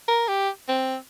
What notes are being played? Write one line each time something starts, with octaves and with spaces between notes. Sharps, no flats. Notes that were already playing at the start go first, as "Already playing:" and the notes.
A#4
G4
C4